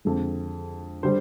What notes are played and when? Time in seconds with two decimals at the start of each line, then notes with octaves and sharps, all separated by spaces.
0.05 F2 D3 G#3
1.03 D3 G3 C5